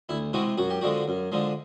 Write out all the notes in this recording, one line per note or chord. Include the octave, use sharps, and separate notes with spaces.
D2 E4
C3 E3 G#3 F#4
F#2 F#4
G4
D3 F3 G#3 F#4
F#2
D3 F3 G#3